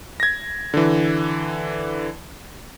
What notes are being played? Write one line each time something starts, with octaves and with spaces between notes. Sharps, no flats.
G#6 A#6
D3 E3